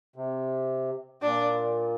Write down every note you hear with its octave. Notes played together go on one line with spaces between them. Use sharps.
C3
A#2 D4